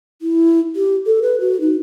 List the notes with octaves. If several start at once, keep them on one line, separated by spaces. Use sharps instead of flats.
E4
G4
A4
B4
F#4
D#4